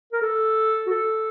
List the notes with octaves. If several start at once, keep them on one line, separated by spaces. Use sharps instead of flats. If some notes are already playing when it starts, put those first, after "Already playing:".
A#4
A4
F#4
A4